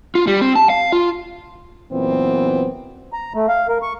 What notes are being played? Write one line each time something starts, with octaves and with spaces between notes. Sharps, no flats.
F4
G3
C4
A5
F5
F4
F#2 A#2 E3 B3 C4
A#5
A3
F5
A#4
C#6